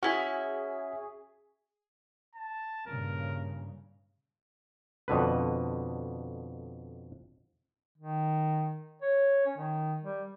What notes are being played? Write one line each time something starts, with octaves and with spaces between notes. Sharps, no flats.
C#4 E4 F#4 G#4 G#5
A5
G2 A#2 C#3 A#4
F2 B2 D3 B4
D#3
C#5
C#4
D#3
G3